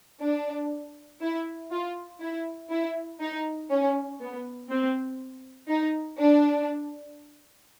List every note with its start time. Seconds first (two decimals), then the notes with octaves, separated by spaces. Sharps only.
0.22 D4
1.22 E4
1.71 F4
2.21 E4
2.71 E4
3.20 D#4
3.70 C#4
4.20 B3
4.70 C4
5.69 D#4
6.19 D4